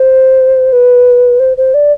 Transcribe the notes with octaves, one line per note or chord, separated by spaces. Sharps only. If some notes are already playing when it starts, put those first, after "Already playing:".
Already playing: C5
B4
C5
C5
D5